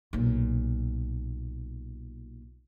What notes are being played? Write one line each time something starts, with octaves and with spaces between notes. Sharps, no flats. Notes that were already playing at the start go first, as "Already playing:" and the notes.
B1 A#2